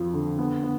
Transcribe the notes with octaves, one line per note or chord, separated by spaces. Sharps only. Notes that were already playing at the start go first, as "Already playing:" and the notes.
Already playing: F2 F3
D3
B3
B3